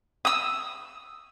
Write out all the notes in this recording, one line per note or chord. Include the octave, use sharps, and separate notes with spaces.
D#6 E6